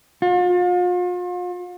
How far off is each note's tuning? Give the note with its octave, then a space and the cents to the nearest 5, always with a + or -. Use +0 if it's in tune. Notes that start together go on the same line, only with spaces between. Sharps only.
F4 +40